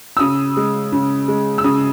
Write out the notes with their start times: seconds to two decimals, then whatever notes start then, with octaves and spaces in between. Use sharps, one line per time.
0.17 E6
0.20 C#3 D#6
0.57 G#3
0.92 C#3
1.28 G#3
1.58 E6
1.64 C#3 D#6